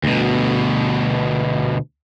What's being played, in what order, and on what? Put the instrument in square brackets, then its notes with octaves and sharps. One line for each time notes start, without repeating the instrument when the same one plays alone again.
[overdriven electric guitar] D2 B2